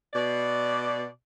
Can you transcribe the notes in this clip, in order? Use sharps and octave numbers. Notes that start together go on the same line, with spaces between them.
B2 D5